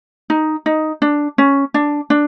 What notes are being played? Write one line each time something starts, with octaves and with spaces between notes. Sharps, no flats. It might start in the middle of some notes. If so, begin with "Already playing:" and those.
D#4
D#4
D4
C#4
D4
D4